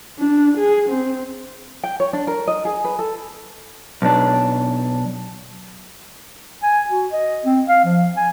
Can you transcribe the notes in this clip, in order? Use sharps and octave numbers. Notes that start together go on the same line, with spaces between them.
D4
G#4
C4
G5
C#5
D4
A#4
D#5
G#4
B4
A4
B1 D4
G#5
F#4
D#5
C4
F5
F3
G#5